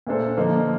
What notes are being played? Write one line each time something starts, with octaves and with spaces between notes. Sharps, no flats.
A#2 A3 D4 A4 C5
D3 F3 A#3 D#4 A#4